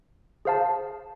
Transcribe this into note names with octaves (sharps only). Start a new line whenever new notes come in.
G#4 C5 F5 A5